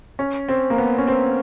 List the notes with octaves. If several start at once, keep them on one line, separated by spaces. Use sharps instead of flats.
C#4
C4
A#3
B3
C#4
C4